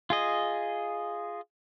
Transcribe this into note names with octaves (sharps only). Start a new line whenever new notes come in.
F4 G#4 D#5